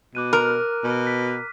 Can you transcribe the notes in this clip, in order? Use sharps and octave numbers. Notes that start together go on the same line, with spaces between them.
B2 D6 F#6 D#7
A#4 F6 F#6
B2
B6